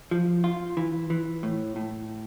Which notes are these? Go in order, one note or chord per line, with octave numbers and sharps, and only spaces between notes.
F3
F4
E3
E3
A2
A2